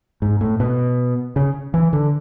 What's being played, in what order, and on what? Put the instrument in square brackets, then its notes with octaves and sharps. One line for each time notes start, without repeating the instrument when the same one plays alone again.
[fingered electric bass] G#2
A2
B2
C#3
E3
D3